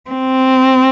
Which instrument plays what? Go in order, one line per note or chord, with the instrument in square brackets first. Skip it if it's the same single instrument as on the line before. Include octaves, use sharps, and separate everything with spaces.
[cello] C4